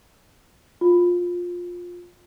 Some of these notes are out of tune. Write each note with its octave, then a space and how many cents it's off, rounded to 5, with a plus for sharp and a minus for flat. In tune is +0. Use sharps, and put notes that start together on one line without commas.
F4 +15